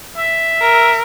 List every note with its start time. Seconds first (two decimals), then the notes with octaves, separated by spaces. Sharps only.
0.17 E5
0.61 A#4